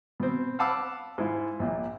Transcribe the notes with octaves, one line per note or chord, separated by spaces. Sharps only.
B2 C4
F5 F#5 A5 B5 D6 E6
G#2 E4 F4
A#1 A#2